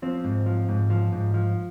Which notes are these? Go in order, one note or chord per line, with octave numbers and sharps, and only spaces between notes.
F3 C4
G#2
F3
G#2
F3
G#2
F3